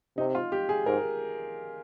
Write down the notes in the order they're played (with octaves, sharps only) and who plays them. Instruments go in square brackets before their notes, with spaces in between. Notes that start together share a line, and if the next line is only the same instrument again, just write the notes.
[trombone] C3 [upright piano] D#4
[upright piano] F4
G4
G#4
[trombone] G#2 [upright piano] A#4